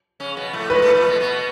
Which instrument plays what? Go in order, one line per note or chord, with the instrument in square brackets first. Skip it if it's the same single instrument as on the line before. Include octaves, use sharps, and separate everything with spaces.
[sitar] C#3 C#4
B2 B3
A2 A3
[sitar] G#2 G#3 [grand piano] B4
[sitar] A2 A3
A2 A3
B2 B3
B2 B3